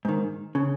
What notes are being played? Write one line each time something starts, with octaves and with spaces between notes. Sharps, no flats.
G#2 D#3
C#3